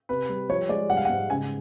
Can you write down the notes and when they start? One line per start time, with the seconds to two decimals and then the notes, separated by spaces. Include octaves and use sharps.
0.09 C3 B4
0.29 G3
0.49 F3 C#5
0.69 G#3 D5
0.89 G3 F#5
0.97 F5
1.05 F#5
1.10 G#2
1.30 C#3 G#5